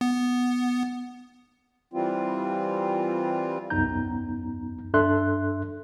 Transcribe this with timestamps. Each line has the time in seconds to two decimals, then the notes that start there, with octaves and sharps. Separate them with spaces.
0.01 B3
1.93 E3 G3 C4 F4
3.70 C2 F#2 B3 D#4 A#5 G6
4.94 G2 D4 A4 E5 C6 F#6